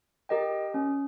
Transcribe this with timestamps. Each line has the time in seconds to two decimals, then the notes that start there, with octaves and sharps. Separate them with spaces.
0.29 G4 A#4 D#5 G5
0.74 C#4